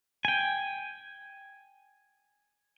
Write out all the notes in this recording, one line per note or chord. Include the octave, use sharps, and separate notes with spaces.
G5 G#5